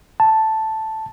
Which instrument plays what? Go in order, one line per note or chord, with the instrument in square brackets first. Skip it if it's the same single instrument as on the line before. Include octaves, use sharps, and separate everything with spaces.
[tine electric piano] A5